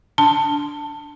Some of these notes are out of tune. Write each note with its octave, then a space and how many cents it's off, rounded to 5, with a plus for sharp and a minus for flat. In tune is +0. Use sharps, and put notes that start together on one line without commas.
D4 -10 A5 +20